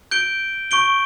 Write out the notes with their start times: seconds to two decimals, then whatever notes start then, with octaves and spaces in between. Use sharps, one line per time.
0.11 G6 D7 G7
0.71 C#6 G6 D7 G7